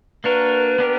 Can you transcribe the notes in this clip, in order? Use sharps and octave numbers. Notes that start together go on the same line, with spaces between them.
A#3 D4 F#4 A#4 B4
B3 D4 G4 A#4